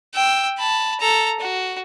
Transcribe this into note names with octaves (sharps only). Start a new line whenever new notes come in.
G5 E6
A5 B5
A4 A#5
F#4